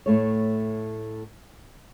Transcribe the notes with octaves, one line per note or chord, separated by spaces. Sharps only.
A2 A3 C#5